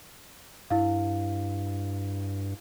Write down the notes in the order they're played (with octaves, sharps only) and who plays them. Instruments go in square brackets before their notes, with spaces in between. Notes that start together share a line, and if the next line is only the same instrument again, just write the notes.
[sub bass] G2 [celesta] E4 F5